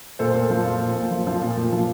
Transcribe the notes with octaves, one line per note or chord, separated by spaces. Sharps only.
A#2 A4 C5
A#2
F3
F3
A#2
A#2
F3
F3
A#2
A#2
F3